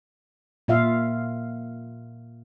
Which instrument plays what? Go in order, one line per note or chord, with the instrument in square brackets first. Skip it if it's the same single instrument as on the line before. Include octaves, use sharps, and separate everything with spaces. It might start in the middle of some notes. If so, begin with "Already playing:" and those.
[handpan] A#2 F4 E5 F5